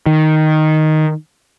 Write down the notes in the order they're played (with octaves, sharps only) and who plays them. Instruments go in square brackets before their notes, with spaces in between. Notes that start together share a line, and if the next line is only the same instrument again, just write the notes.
[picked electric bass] D#3